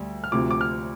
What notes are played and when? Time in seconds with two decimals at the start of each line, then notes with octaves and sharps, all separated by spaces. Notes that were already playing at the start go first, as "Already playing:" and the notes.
Already playing: D2 G3
0.24 F6
0.32 D2 C3 F3 D6
0.51 D6
0.61 F6